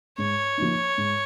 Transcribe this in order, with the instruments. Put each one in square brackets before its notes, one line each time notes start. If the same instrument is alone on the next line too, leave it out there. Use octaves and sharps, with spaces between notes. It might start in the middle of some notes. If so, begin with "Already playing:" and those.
[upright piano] G#2 [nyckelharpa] C#5
[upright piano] F3 A#3 D#4
G#2